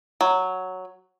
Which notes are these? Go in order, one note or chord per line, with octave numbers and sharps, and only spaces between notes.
F#3